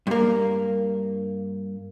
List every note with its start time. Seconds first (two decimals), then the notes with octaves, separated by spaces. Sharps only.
0.07 G2 A#3